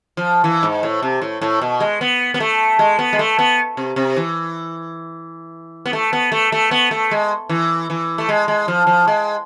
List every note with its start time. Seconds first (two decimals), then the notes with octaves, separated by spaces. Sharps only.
0.17 F3
0.44 E3
0.63 G#2
0.83 A2
1.03 C3
1.22 A2
1.42 A2
1.62 B2
1.80 G#3
2.01 B3
2.34 B3
2.40 A3
2.79 G#3
2.99 B3
3.13 G#3
3.19 A3
3.39 B3
3.77 C3
3.96 C3
4.17 E3
5.86 B3
5.93 A3
6.13 B3
6.32 A3
6.52 A3
6.71 B3
6.91 A3
7.11 G#3
7.49 E3
7.90 E3
8.18 A3
8.29 G#3
8.48 G#3
8.68 F3
8.87 F3
9.08 G#3